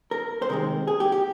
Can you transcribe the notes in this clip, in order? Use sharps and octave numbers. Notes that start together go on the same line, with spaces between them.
A#4
C5
C3 D#3 G#3 C4 A#4
G#4
G4
G4